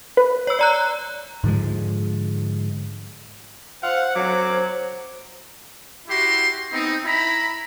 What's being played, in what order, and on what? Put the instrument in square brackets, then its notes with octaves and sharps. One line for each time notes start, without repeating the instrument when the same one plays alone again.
[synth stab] B4
[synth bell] C#5 E6
D5 A#5 F#6
[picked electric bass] G#2 D3 F3 G#3
[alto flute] C5 [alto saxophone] F5 [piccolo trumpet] F#5
[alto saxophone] F#3 [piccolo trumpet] D6
[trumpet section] E4 F#4 G4 C6
B3 C4 D#4
E4 A#5 B5